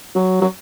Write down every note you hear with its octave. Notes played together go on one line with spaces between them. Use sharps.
F#3
F#3